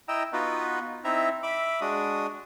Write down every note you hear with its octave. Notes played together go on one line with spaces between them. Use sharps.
E4 D#5 G5 A#5 E6
B3 D#4 F4 F#4 B4
C4 D#4 E4 E5 A#5
E5 B5 D6
G#3 D4 F#4 D#6